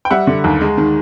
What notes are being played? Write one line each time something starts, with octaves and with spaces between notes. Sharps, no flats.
G5
G3 E5 F#5
D3
D#2
G#3
D#3